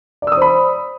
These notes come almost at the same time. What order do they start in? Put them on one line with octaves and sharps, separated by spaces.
D5 E6 D#6 C5 B5